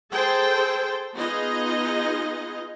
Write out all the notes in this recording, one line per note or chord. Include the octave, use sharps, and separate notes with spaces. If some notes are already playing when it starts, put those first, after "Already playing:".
G#4 A4 C5 G5 A5
B3 D#4 F4 G#4 D#5